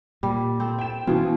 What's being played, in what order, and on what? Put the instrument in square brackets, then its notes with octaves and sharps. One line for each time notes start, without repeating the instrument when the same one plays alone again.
[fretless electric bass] A#2 [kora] G3
[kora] C4 A4
[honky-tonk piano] G5 E7
[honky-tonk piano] B2 E3 [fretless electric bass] B3 C#4 [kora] F4